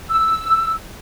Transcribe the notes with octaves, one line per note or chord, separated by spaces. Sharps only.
E6